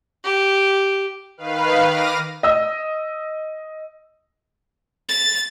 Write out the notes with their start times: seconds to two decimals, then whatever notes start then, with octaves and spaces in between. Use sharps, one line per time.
0.24 G4
1.38 D#3 B4 F5
1.88 D6 F6 A#6 D#7
2.43 D#5 E6
5.09 A6